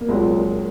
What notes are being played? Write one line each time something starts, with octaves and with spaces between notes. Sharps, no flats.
A#3
C2 A#2 F#3 G#3 C4